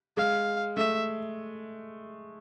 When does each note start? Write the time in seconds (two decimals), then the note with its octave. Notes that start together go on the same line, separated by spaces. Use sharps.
0.17 G#3 F5
0.77 A3 E5